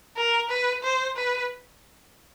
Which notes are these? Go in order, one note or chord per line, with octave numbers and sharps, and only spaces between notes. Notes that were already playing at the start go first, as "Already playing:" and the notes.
A#4
B4
C5
B4